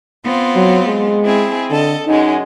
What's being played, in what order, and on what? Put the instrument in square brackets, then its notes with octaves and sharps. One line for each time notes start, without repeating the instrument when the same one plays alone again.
[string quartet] B3 C4 F4
[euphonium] F#3
G#3
[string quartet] C4 E4 G#4
[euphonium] D3 [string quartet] A4 D#5
[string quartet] F#2 G#3 G#4 [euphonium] D#4